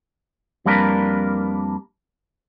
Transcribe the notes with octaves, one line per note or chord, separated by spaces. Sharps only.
F2 G3 A#3 D4 A#4 B4